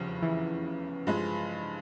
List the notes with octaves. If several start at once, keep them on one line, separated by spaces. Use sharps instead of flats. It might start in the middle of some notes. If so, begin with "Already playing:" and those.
Already playing: F1 E2 C#3 F3 G3
E3
G2 F3 G#3